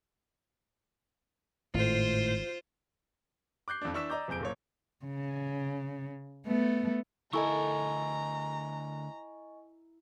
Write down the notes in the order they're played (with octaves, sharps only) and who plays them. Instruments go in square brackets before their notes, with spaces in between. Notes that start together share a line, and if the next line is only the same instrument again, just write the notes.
[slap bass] G#1 [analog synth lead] A2 [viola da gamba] F4 C5
[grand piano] D6 F#6 G6 C7
F2 D4
E3 D4 C#6 E6 B6 E7
D5 D#5 A#5 D6 G6
F#1 F2 G#4 G6 D7
F#1 A#2 C#5
[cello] C#3
A3 B3
[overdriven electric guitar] D2 A#4 [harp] E4 A4 [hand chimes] D#5 G#5 C#6 [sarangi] A#5